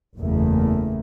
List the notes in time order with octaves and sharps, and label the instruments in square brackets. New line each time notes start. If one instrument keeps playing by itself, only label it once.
[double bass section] F#1 E2 A3 A#3